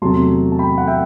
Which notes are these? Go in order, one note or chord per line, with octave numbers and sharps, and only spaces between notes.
E2 C3 F#3 A3 A5 C6
A5
G5 B5
F#5
E5 G5